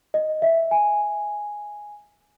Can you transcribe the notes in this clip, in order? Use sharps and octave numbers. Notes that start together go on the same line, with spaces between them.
D#5
E5
G#5